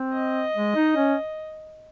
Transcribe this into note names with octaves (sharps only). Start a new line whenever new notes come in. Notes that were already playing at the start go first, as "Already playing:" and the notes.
Already playing: C4
D#5
G#3
D#4
C#4